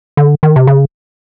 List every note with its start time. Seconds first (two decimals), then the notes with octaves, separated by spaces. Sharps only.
0.17 D3
0.43 D#3
0.56 C3
0.67 C#3